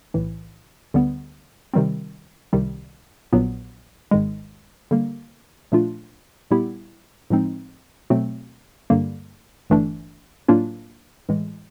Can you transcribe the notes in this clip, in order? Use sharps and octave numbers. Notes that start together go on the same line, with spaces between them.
B1 A2 E3
D2 D3 G3 B3
C3 D#3 G3 C4
C2 C3 D#3 G3
A#1 A#2 F#3 B3
G#1 G#2 D#3 G#3
D3 G3 A#3
A#2 F3 A3 D4 F4
A#2 G3 B3 E4 G4
A2 F3 G#3 C4 D#4
B2 F#3 A3 C4
G2 D3 G3 A#3
G1 G2 E3 A3 D4
A2 F#3 A#3 D4 F4
A2 E3 G#3